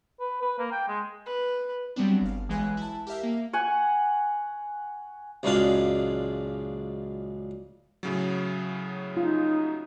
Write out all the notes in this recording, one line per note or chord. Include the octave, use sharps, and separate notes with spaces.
B4
B4
A#3
G5
G#3
B4
F#3 G3 B3 C4 D4
G1 F5
B1 E3 G#3 B4 G#5 F#6
E4 A5
G4 A#4 E5 F5
A#3
F#5 G#5 C#6
C#2 F#2 A#2 G#3 D4 F5
A2 C#3 F#3
D#4 F4